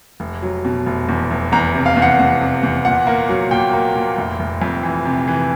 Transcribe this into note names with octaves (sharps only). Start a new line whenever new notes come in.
F1
F#3
B2
F1
E2
F1
E2 A#5
C3
F5
E2
F#5
E2
C3
E2
A#2 F#5
A#3
F#3
A#2 G5
A#3
A#2
F1
F1
F2
E3
C3
E3